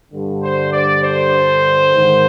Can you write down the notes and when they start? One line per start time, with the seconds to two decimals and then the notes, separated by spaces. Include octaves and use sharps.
0.12 G2 D3
0.43 C5
0.72 D5
1.03 C5
1.93 G#2 D#3